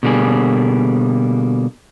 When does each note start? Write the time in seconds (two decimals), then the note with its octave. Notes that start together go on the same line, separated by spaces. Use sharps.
0.03 B2 D3 G3 A#3 G#4